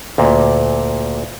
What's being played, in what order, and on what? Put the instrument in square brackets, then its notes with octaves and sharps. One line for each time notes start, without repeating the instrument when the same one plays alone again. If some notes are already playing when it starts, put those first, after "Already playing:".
[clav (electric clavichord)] D2 A#2